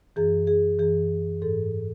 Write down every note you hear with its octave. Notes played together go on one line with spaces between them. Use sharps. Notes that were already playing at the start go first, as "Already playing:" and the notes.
F#2 E3 G#4
G#4
F#2 E3 G#4
G#2 E3 A4